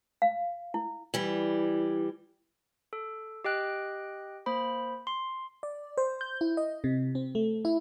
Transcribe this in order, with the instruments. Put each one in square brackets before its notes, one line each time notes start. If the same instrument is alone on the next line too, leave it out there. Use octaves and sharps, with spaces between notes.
[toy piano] F5
E4
[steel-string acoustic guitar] E3 G3
[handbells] A4
G4 D#5 G5 F#6
A#3 C5 B5
C6
[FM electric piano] D5
C5
G6
E4
D#5
C3
C4
A3
E4